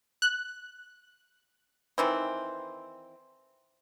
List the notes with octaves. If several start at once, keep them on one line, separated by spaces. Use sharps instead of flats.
F#6
D#3 E3 C4